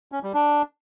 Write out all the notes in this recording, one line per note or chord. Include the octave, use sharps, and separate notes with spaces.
C#4
G3
D4